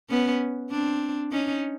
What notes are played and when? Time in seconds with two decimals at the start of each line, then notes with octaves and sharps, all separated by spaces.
0.10 B3 C#4
0.71 C4 D4
1.31 C#4 D#4